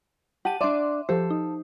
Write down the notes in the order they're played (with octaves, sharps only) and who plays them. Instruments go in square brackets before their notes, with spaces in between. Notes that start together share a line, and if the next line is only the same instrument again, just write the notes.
[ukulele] G4 [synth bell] F#5 A5 D#7
[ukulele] D4 D5 [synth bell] E5 C6 D6
[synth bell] F3 G4 C5 [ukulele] A4
[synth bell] D#4